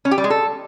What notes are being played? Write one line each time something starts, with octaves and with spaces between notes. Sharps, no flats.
C#4
G4
G3
G#3
A4